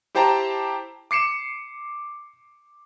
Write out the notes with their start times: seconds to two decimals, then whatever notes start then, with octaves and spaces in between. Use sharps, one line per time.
0.15 E4 G4 C5 G5 A5 A#5
1.11 D6 C7 C#7 E7